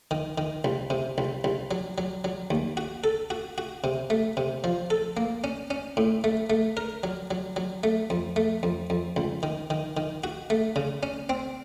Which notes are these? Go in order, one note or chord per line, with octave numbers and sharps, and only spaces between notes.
D#3
D#3
C2
C3
C2
C2
F#3
F#3
F#3
D#2
F#4
A4
F#4
F#4
C3
A3
C3
F3
A4
A#3
C#4
C#4
A2
A3
A3
A#4
F#3
F#3
F#3
A3
F2
A3
F2
F2
C#2
D#3
D#3
D#3
F#4
A3
C#3
C#4
C4